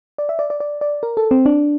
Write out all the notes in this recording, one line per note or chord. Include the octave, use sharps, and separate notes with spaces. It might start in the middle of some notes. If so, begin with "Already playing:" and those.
D5
E5
D5
D5
D5
D5
A#4
A4
C4
D4